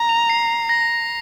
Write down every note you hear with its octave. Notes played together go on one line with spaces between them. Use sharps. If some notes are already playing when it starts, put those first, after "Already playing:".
Already playing: A#5
F7
C7
A#6